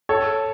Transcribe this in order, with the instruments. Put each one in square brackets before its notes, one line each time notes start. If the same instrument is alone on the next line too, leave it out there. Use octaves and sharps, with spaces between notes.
[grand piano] A4 C#5